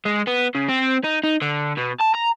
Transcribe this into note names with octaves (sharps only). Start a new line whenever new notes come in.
G#3
B3
C#3
C4
D#4
D#4
D3
B2
A5
A#5